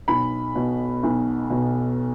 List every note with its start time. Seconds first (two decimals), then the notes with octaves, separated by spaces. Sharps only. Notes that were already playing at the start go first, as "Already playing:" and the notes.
0.08 B1 B5
0.55 B2
1.03 B1
1.50 B2